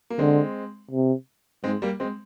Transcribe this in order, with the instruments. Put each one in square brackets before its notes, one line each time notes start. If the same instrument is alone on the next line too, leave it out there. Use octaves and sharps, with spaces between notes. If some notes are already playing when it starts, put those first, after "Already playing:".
[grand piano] A#3
[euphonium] D3 [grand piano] G#3 C4
[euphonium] C3
[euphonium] G#2 [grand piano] G#3 C4
[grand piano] G3 A#3
G#3 C4